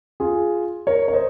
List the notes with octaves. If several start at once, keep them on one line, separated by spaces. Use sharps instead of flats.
F4 G#4
A#4 C#5
C#5
C5 D#5